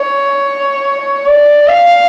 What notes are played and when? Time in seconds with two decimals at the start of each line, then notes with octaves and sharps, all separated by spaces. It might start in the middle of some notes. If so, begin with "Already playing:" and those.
Already playing: C#5
1.26 D5
1.67 F5